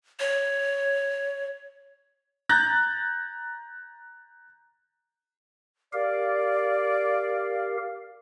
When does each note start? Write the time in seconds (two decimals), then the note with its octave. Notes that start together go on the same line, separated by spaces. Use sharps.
0.20 C#5
2.49 A#5 F#6 G6 A6 A#6
5.93 G4 A#4 D5 F5